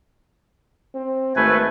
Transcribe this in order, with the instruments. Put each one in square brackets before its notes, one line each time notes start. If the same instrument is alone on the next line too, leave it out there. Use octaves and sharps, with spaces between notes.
[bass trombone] C4
[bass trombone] G#1 [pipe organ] A3 B4 [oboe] G#5